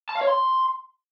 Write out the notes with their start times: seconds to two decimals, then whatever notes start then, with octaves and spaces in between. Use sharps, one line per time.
0.09 A5
0.15 F5
0.21 C#5
0.27 C6